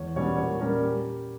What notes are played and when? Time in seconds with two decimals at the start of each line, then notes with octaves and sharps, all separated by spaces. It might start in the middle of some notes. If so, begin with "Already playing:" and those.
Already playing: E2 C#5
0.16 B2 G3 C#4 C#5
0.38 A#2 C#5
0.61 G3 C#4 A#4
0.84 G4